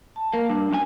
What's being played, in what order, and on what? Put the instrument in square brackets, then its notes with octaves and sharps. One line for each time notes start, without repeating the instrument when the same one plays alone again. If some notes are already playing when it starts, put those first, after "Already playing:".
[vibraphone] A5
[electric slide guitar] A#3 [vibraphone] A#4
[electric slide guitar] G2 [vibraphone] D4
[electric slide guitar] F#2 F4 G#5